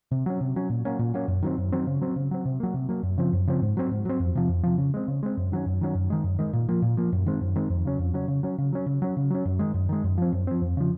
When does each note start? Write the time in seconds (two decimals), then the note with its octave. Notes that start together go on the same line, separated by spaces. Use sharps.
0.11 C3
0.26 F#3 C#4
0.41 C3
0.56 F#3 C#4
0.70 A#2
0.85 F#3 A#3 C#4
0.99 A#2
1.14 F#3 A#3 C#4
1.28 F#2
1.43 D#3 F#3 C4
1.58 F#2
1.72 D#3 F#3 C4
1.87 C#3
2.01 F#3 C4
2.16 C#3
2.31 F#3 C4
2.45 C3
2.60 F#3 A#3
2.74 C3
2.89 F#3 A#3
3.03 F#2
3.18 C#3 F3 C4
3.33 F#2
3.47 C#3 F3 C4
3.62 G#2
3.77 F#3 C4
3.91 G#2
4.05 F#3 C4
4.20 F2
4.35 C3 F3
4.49 F2
4.63 C3 F3
4.78 C#3
4.94 G#3 C4
5.08 C#3
5.23 G#3 C4
5.37 F#2
5.52 D#3 F#3 C#4
5.66 F#2
5.81 D#3 F#3 C#4
5.95 F#2
6.10 D#3 G#3
6.24 F#2
6.39 D#3 G#3
6.53 A#2
6.69 F3 A#3
6.82 A#2
6.97 F3 A#3
7.13 F#2
7.26 D#3 G#3 C4
7.41 F#2
7.56 D#3 G#3 C4
7.70 F2
7.85 C#3 F#3 C#4
7.99 F2
8.13 C#3 F#3 C#4
8.28 C#3
8.43 F#3 C#4
8.58 C#3
8.73 F#3 C#4
8.86 C#3
9.02 F#3 C#4
9.17 C#3
9.30 F#3 C#4
9.45 F#2
9.59 D#3 G#3
9.74 F#2
9.89 D#3 G#3
10.04 F#2
10.18 F3 C4
10.33 F#2
10.47 F3 C4
10.62 F2
10.77 C#3 F3